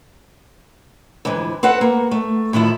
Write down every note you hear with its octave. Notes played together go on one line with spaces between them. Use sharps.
F2 G#2 D3 E3
C4 A4 B4 F#5
A#3
A3
A2 D#3 F3 E4